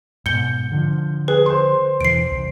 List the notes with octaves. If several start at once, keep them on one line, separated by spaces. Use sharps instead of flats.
G#2 B2 G6 C#7 G7
D3 F3
G#4 B4
C5 C6
E1 E3 C7 D7
C2